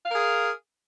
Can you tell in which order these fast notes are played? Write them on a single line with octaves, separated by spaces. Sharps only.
F5 A#4 G#4